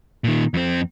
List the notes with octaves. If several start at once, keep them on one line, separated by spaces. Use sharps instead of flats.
A#2 D#3
F2 C4